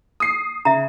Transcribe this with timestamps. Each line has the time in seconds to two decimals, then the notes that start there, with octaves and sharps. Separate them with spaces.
0.20 D#6 C7
0.65 C#3 E5 A#5